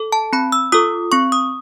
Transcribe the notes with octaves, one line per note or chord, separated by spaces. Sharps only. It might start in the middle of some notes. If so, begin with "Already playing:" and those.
Already playing: A4
A5
C4 B5
E6
F4 A4 D#6
C4 C#6
D#6